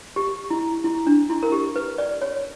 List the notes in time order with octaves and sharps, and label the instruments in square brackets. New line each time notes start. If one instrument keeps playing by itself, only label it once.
[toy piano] G4
E4
E4
D4
E4
A#4
G4
B4
D5
C#5